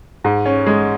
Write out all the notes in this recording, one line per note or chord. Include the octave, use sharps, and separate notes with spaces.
G#2
C#4
G#3